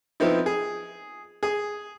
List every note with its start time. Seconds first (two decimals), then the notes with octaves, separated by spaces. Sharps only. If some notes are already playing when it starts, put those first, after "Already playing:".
0.20 F3 B3 C4 D#4 E4
0.46 G#4
1.43 G#4 D#6